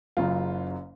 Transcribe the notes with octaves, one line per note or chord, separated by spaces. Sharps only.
F#1 F#2 C#3 F#3 F4